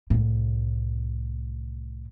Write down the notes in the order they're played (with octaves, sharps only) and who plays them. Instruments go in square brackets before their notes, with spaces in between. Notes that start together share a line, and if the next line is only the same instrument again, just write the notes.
[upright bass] C2 A2